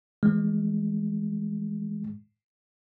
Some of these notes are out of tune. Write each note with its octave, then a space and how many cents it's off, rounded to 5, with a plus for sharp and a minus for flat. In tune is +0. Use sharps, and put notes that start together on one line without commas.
E3 -15 G#3 +0